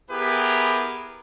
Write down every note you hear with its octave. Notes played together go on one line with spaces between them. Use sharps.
B3 E4 G4 G#4 A#4 B4